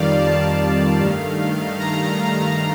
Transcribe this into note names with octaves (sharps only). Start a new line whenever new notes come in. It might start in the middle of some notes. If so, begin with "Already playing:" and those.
Already playing: F2 D#3 G3 D5 F5
A5
F5
G2 D#3 A3 F5
A#5